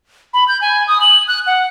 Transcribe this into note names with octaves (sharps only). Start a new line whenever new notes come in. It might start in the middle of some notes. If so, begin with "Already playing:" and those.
B5
G6
G#5
D#6
F#7
F#6
F#5